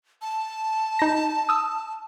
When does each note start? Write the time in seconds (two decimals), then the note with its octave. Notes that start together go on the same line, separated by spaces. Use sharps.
0.22 A5
0.99 D#4 A#6
1.49 D#6 E6